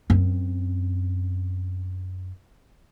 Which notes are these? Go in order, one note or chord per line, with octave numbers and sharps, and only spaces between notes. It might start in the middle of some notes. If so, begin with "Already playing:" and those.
F#2 C4